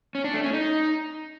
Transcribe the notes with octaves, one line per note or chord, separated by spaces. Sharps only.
C#4
D4
A3
C#4
D#4